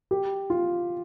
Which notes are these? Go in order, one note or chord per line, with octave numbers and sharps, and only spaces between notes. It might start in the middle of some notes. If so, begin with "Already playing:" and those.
G4
F4